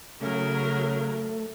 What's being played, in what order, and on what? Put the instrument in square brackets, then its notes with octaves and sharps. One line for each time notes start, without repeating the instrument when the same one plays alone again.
[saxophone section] C#3 [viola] F#3 A#4 [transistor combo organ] A3